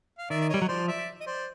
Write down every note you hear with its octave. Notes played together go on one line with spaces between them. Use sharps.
F5
D#3 D5 E5
D5
G3 C#5 D#5
F#3
F3 C5 D5
D5 E5
D#5
C5 D5